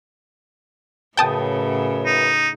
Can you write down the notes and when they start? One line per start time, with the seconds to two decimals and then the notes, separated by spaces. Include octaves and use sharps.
1.17 F#2 A2 C#3 B4 G5 A5 D#6
2.06 D#4